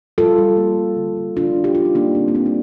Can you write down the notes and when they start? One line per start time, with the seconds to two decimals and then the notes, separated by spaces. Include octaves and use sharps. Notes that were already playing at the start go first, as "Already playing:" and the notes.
0.18 G3 F4 A4
0.38 G3
0.57 A#3
0.77 G3
0.96 D3
1.17 D3
1.36 D3 D4 F4
1.56 D3
1.64 G4
1.75 G3 F4
1.85 D#4
1.95 G3 A#3 D4
2.15 D3 C4
2.28 A#3
2.35 G3 C4
2.46 D4